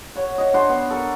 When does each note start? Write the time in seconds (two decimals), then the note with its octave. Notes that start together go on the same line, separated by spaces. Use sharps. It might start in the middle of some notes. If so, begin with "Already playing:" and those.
0.15 C#5 F#5
0.38 F#4 D#5
0.53 D4 F#4 C5
0.69 B3
0.90 A4 A#4